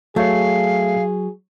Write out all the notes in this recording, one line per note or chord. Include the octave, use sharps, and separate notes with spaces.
F#3 A3 G#4 C#5 F5